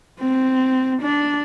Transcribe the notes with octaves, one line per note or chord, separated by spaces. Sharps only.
C4
D4